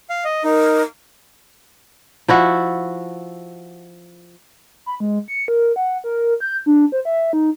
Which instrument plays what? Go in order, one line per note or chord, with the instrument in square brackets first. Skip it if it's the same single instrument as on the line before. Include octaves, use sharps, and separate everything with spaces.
[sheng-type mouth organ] F5
D#5
[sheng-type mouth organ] D#4 [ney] A#4
[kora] F3 E4 F#4
[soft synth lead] B5
G#3
C#7
A#4
F#5
A#4
G6
D4
C5
E5
D#4